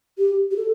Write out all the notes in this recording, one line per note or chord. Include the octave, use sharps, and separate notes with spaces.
G4
G4
A4